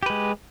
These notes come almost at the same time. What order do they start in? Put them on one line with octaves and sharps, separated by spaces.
G4 B4 G#3